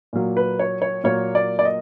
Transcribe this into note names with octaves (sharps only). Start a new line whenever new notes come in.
A#2 F#3 A#3
B4
C#5
C#5
A#2 F#3 A#3 C#5
D5
D5
D#5